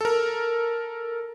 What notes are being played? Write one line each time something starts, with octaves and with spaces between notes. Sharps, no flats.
A4 A#4